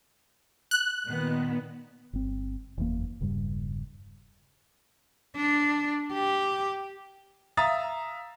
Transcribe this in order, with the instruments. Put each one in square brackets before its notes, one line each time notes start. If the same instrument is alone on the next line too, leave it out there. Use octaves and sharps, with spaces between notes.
[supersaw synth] F#6
[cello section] A#2 D#3 B3
[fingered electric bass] G1 C4
F#1 E2 A#3
E1 G2 C#3 G3
[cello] D4
G4
[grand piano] E5 F5 A#5 D#6 A6